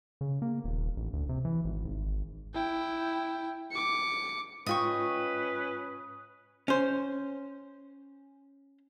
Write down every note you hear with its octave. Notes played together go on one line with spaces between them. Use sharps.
C#3
A#3
D#1
A1
D2
C3
E3
G#1
G#1
E4 G5
D6 C#7
G#2 C#4 F4 B4 D#5 G5 C#6 D#6
C#4 C5